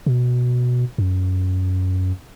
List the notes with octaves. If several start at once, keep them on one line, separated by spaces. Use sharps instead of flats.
B2
F#2